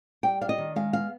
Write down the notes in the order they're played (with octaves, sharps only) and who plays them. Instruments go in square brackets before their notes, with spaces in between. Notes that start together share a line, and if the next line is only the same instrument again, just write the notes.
[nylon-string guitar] G3 G5
D4 F5
D#5
D#3
G#3 F5
B3 F5